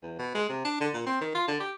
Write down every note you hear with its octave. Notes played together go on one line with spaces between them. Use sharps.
E2
B2
G#3
C3
D4
D3
A#2
C4
D#3
F4
D3
G4